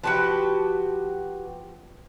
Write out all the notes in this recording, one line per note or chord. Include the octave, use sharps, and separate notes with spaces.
F3 F#4 G4 B4 A5